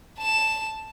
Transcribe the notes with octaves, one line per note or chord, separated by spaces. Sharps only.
A5 E7